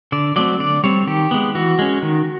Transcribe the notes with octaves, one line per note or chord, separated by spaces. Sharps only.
D3 D5
F#3 A3 C4 D5
D3 D5
G3 C4 C#5
D#3 G4
G#3 B3
E3 F#4
G#3 C#4
D#3